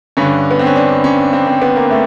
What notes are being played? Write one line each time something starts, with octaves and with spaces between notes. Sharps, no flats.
G2 D3 C#4
B3
C4
C#4
D4
C#4
C4
C4
B3
A#3
A3